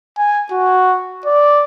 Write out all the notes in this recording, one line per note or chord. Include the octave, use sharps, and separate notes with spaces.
G#5
F#4
D5